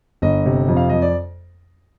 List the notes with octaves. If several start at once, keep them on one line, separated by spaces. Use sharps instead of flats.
G1 D#5
C3
F2
F5
F2 D#5
D5